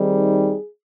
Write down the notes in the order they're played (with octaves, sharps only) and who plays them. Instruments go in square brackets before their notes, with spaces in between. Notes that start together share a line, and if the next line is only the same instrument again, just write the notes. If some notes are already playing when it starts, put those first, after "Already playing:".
Already playing: [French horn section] D#3 G3 C4 D#4 G#4